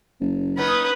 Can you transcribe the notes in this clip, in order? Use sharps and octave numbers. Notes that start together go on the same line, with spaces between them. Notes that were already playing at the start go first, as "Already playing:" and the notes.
F#1
B3 C#4 D#4 B4